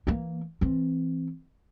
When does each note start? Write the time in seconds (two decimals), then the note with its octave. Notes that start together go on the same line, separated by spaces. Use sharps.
0.07 E3 A#3
0.61 E3 C4